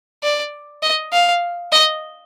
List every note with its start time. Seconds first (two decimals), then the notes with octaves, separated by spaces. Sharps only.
0.23 D5
0.83 D#5
1.13 F5
1.72 D#5